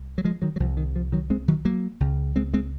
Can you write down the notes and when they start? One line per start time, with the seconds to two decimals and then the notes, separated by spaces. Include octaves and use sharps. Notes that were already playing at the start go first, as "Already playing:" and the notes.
Already playing: C2
0.18 F#3
0.25 F3 G#3
0.42 D#3 F#3
0.56 F#3
0.60 C2 F3
0.63 C3
0.77 D#3
0.96 F3
1.12 D#3 F#3
1.30 G#3 C4
1.48 D#3 F#3
1.65 F#3 A#3
2.00 C#2 C#3
2.36 G#3 C4
2.54 G#3 C4